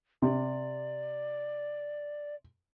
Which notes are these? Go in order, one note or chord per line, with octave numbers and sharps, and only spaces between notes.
C3 D5